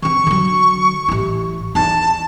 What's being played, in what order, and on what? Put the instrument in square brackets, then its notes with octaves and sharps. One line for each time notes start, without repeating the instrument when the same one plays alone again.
[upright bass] E3 C4 [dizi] C#6
[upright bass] D3 F#3
A1 E4
[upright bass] E2 D#4 [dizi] A5